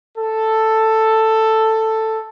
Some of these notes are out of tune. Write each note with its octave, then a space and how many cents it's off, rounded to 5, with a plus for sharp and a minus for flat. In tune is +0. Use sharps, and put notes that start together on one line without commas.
A4 +5